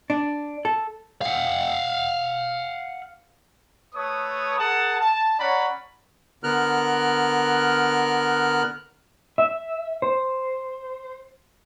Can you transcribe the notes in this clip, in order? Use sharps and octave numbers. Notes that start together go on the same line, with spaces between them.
D4
A4
F5 F#5
A3 A4 B4 C#5 D#6
G#4 A#4 F#5 A5
A5
C#4 C#5 D5 F#5 A#5 B5
D3 B3 A#4 F6 F#6
E5
C5